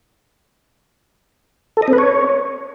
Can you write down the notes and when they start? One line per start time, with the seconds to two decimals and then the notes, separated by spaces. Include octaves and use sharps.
1.77 A4
1.82 D#5
1.88 C4
1.93 B4
1.98 C#5